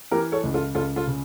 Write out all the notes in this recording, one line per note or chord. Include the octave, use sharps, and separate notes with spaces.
E3 G4 A#4
A4 C#5
C#2
F4 A4
C#2 F4 A4
F4 A4
C#3